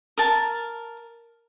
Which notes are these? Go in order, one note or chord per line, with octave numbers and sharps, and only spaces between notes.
A#4 A5